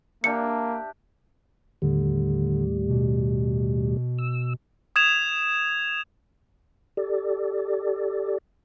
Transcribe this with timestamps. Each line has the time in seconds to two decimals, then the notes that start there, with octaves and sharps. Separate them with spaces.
0.24 A#3 D4 G4 E5 C#7
1.82 D#2 A2 D3 G3
2.89 B2
4.19 E6
4.96 D#6 G#6 E7 F7
6.97 G4 A4 D5